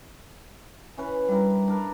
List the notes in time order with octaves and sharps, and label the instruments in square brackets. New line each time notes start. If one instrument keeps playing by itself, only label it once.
[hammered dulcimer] E3 C#4 B4
[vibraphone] G3 [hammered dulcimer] D4 E4 A#4
[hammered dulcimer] D4 A#4 B4